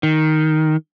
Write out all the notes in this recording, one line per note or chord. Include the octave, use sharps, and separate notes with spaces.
D#3